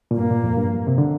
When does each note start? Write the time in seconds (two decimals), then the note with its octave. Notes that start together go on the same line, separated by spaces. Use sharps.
0.11 A#2
0.17 G2 A#3
0.31 A#2
0.44 F2
0.57 G2
0.87 C3
0.98 D3